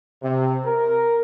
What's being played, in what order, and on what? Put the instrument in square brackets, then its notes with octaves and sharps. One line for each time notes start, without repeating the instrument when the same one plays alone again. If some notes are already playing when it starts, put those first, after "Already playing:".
[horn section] C3
A#4